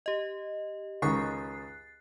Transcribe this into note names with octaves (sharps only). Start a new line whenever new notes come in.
G4 D#5
C#2 D#3 C#6 F#6 A6 C7